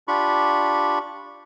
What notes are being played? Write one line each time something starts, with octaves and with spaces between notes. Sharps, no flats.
D4 F4 G4 B5 C#6